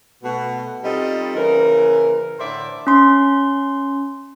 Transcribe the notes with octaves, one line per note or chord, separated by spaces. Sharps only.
B2 A3 F#4
G3 C4 D#4 F4 A4 D#5
C#3 E3 A#3 A#4
A2 D3 C5 D5 E5
C#4 C6